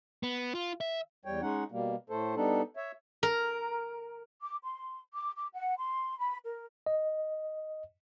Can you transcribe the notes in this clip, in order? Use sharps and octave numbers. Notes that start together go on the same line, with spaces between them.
B3
F4
E5
E2 G3 C#5 G5
G#3 C#4 D#4 F#5
B2 G3 A#3
A2 A3 A4 C5
G3 B3 D4 D#4 A4
C#5 E5
A#4
D6
C6
D6
D6
F#5
C6
B5
A#4
D#5